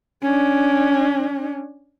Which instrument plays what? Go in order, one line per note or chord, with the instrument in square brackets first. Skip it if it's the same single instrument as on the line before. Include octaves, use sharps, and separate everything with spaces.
[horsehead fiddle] C#4 D4